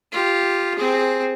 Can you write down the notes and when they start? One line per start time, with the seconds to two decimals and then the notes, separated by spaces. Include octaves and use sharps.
0.12 F4 G4
0.76 C4 G#4